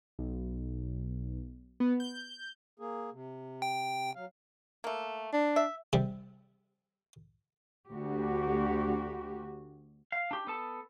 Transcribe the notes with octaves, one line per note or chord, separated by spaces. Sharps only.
B1
B3
G6
A#3 G#4
C3
G5
F#3 F5
A3 A#3
D4
E5
C3 G3
D2 F#4 G4
F5
D4 G4
B3 A4 A5